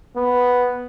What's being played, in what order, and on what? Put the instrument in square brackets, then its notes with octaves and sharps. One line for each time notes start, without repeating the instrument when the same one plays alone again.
[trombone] B3